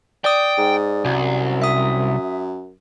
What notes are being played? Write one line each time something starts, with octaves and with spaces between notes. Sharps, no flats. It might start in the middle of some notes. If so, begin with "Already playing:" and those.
D5 G5 D#6
G#2
C2 F#2
E5 D#6